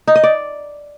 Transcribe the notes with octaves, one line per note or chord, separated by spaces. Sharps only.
D#4
D#5
D5